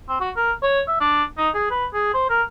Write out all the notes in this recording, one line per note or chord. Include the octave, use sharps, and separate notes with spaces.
C4
F#4
A#4
C#5
E5
D4
D#4
G#4
B4
G#4
C5
A#4